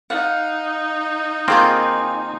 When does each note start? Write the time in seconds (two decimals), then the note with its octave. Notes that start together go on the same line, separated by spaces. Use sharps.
0.10 D#4 F5 F#5
1.48 D#3 A#3 C4 F4 G#4 G5 C6